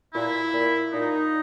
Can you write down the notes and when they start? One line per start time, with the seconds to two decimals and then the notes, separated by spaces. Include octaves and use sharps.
0.14 A#2 E4
0.53 A#2
0.92 A#2 D#4